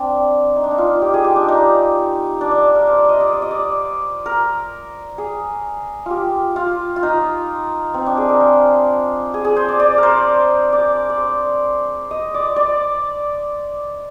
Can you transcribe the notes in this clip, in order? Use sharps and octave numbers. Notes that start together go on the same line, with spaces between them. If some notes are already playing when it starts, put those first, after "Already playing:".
Already playing: C4 D4
D#4
D4
D#4
F4
G4
G#4
G4
D4
D#4
D4
D4
A#4
C5
D5
D#5
D5
D5
D#5
D5
A#4
G#4
F4 G4
F4
F4
D#4
C4
D4
G#4
A#4
C5
G#4
G#4
C5
D5
D5
A#4 C5
D5
D5
C5
D#5
D5
D5